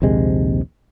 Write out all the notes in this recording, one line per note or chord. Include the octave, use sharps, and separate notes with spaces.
A#1 D#2 C3 G#3